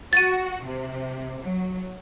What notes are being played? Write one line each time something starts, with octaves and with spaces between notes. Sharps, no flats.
F#4 A6 D#7
C3
F#3